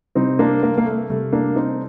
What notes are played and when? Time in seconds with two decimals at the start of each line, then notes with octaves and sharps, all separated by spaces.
0.15 C3 G3 C4 D#4
0.39 A#3 D4
0.63 A#3
0.78 A#3
0.86 A3
1.10 C3 G3 A3
1.32 A#3 D4
1.56 C4 D#4